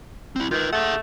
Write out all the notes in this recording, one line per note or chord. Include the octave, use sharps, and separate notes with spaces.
C4 E4
D#3 F4 B4
A3 G#4 F#5